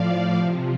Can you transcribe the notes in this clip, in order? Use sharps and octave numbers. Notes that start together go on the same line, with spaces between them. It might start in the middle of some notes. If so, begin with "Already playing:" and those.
Already playing: A2 F3 D5 F5
C3 F3